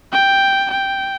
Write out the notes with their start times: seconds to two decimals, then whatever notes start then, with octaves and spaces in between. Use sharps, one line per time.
0.13 G5
0.71 G5